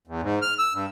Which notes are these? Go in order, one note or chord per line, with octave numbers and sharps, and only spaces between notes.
E2
G#2
F6
E6
G2